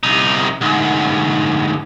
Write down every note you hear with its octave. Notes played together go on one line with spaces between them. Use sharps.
C2 D#4
D2 G#2